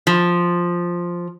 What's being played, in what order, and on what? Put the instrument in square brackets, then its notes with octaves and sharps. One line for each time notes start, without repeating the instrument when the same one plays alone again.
[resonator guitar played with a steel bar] F3